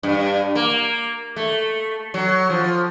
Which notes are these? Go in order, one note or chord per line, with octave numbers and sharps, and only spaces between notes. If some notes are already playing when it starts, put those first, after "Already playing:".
G2
A#3
A3
F#3
F3